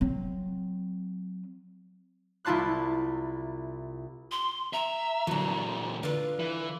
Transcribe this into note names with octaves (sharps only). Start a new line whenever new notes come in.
F#3 C4
C2 E4 F4 A5 C6 F#6
C6
E5 A#5
A#2 D3 E3 F#3
D3 F4 B4
E3